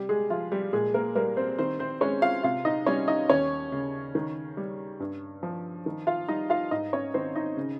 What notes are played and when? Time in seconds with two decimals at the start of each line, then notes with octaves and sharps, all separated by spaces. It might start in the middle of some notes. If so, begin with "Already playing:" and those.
Already playing: C3 G3 G4
0.09 G#3 G#4
0.30 F3 F4
0.52 G3 G4
0.73 A#2 G#3 G#4
0.94 A#3 A#4
1.15 G3 A#3 A#4
1.37 C4 C5
1.58 D#3 C4 C5
1.79 C4 C5
2.01 G#3 C#4 C#5
2.22 F4 F5
2.43 C3 F4 F5
2.65 D#4 D#5
2.86 G3 C#4 C#5
3.08 D#4 D#5
3.29 D#2 C#4 C#5
3.72 C#3
4.15 D#3
4.57 G3
5.00 G2
5.43 F3
5.86 D#3
6.07 F4 F5
6.28 G3 D#4 D#5
6.50 F4 F5
6.71 G#2 D#4 D#5
6.93 C#4 C#5
7.14 D#3 C4 C5
7.36 D#4 D#5
7.57 C#3